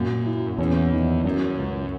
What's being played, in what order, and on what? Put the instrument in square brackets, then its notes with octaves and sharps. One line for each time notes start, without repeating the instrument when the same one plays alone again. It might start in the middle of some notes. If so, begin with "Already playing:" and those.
Already playing: [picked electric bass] F#2 [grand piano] A#2 F#4
[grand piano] E4
[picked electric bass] E2 [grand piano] C#4
[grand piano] D#3
[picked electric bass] F#2 [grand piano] C#4
[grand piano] C#2